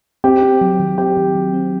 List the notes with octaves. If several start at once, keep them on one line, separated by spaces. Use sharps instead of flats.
C4 G4
C4
F#3
D#3
C4 G4
D#3
F#3
C4